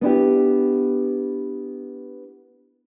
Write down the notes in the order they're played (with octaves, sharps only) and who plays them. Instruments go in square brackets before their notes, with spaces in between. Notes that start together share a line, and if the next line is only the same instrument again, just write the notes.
[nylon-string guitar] B3 D4 E4 G4